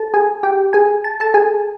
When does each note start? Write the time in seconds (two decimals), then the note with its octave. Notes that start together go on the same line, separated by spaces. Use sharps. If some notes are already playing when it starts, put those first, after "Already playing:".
Already playing: A4 A5
0.14 G#4 G#5
0.43 G4 G5
0.73 G#4 G#5
1.04 A5
1.20 A4 A5
1.34 G#4 G#5